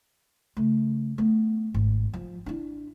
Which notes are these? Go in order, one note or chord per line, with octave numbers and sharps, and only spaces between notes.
C#3 A3
A3 B3
G#1
F3
D4 E4